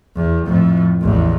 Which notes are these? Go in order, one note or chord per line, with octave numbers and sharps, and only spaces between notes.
E2
F2 A2
A1 E2